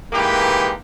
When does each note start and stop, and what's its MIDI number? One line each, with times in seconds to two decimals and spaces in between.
0.13 0.71 51
0.13 0.71 52
0.13 0.71 56
0.13 0.71 58
0.13 0.71 67
0.13 0.71 71